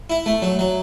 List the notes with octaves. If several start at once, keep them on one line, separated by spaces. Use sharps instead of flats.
E4
A3
F#3
F#3